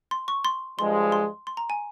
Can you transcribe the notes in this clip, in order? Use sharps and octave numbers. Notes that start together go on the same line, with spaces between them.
C6
C#6
C6
G2 F3 G#3 C6
C6
C6
A#5
G#5